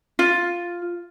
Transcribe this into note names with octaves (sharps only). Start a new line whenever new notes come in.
F4